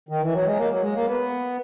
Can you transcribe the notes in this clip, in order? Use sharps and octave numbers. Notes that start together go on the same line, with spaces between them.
D#3
E3
F#3
G#3
A#3
F#3
G#3
A#3
B3